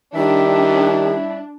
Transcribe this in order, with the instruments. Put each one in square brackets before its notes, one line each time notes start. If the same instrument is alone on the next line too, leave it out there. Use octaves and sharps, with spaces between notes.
[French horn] D#3 [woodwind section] G3 E4 E5 [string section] D4 [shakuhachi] G4